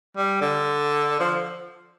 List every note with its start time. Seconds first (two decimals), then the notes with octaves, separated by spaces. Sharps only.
0.17 G3
0.41 D3
1.20 F3